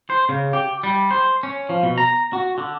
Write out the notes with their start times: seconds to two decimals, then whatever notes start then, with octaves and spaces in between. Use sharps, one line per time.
0.10 C5
0.29 C#3
0.53 G4
0.83 G3
1.11 C5
1.43 C#4
1.69 F3
1.83 B2
1.98 A#5
2.33 F#4
2.58 D3